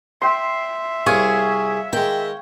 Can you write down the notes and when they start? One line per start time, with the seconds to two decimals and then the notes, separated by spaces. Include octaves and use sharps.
0.22 E5 G5 C6
1.06 C2 C3 G#4 C#5 F5
1.93 D#3 G#3 G5